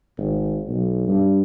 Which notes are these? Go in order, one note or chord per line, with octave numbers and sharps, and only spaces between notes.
G#1
B1
G2